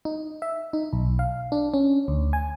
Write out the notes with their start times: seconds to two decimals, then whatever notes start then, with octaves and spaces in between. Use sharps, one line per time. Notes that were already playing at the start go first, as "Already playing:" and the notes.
0.05 D#4
0.42 E5
0.73 D#4
0.93 B1
1.19 F5
1.52 D4
1.74 C#4
2.08 D2
2.33 G#5